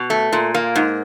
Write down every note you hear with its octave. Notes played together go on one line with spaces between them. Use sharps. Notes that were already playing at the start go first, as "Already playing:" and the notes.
Already playing: B2
A3
A#2
A#3
G#2